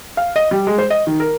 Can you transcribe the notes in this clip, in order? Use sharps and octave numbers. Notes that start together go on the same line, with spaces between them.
F5
D#5
G3
G#3
C5
D#5
D#3
A#4